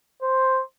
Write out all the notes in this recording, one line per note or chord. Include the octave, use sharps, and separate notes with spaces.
C5